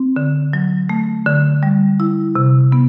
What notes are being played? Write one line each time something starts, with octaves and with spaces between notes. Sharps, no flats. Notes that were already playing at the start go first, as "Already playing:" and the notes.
Already playing: C4
D3
F#3
A3
D3
G3
E4
C3
B3